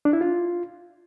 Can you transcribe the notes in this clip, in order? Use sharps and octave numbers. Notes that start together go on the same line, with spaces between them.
D4
E4
F4